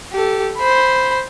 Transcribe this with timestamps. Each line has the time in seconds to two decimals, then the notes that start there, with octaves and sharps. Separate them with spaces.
0.13 G4 A4
0.58 C5 B5